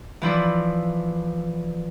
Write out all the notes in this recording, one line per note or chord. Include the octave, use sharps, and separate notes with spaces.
E3 F3 E4 D5